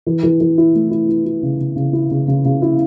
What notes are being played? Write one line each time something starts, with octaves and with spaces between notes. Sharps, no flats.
E3
E3
E3
E4
A3
E4
E4
E4
C#3
C#3
C#3
E4
C#3
C#3
C#3
E4